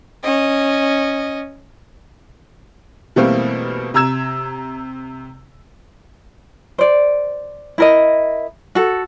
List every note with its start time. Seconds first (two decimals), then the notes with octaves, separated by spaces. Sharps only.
0.24 C#4 D#5
3.16 B2 E3 G3 A3 A#3 C4
3.94 C3 A#5 E6 G#6 E7
6.78 C5 D5
7.78 E4 A#4 D#5
8.75 F#4 A4